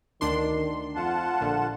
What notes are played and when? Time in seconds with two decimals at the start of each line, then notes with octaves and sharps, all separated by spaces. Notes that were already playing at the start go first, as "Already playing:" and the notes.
0.21 D2 D#3 D4 C6
0.96 F2 F4 F#5 A5
1.41 A#1 D3